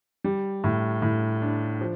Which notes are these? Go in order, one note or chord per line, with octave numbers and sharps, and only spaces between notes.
G3
A2
A2
D4
F3